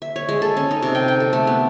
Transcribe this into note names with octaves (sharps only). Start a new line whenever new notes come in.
E5
C#5
G#3
A4
C#4
D#4
C3
G5
G5
A4
A3
B3